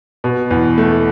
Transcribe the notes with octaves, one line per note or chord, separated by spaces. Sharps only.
B2
E2
A3